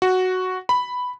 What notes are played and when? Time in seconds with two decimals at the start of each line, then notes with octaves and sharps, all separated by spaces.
0.02 F#4
0.69 B5